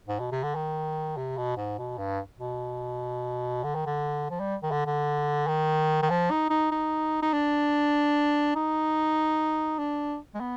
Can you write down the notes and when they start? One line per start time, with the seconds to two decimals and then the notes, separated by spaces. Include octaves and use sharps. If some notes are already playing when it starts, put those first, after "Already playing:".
0.08 G#2
0.20 B2
0.32 C3
0.43 D3
0.55 D#3
1.17 C3
1.37 B2
1.57 G#2
1.78 B2
1.98 G2
2.40 B2
3.64 D3
3.75 D#3
3.86 D3
4.30 F3
4.40 G3
4.63 D#3
4.71 D3
4.86 D3
5.47 D#3
6.02 D#3
6.10 F3
6.31 D#4
6.50 D#4
6.71 D#4
7.22 D#4
7.33 D4
8.55 D#4
9.79 D4
10.34 G#3
10.40 B3